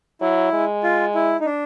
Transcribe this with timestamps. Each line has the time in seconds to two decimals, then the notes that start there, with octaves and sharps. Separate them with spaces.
0.21 F#3 E4
0.53 G#3
0.83 F4
1.15 E4
1.40 D#4
1.45 D4